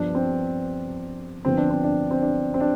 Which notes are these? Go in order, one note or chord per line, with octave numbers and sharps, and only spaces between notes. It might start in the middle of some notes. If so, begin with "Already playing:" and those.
Already playing: G2 F3 B3 D4
C4
G2 D3 F3 B3 C4
D4
C4
D4
C4
D4
C4
D4